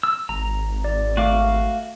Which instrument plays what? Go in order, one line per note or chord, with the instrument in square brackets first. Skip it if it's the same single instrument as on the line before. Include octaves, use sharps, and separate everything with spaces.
[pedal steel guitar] E6
[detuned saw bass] G#1 [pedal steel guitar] A#5
[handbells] D5
[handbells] A3 [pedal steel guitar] F#4 F5 D6